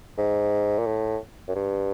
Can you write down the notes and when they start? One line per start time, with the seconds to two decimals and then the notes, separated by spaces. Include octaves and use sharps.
0.18 G#2
0.79 A#2
0.86 A2
1.48 F#2
1.55 G2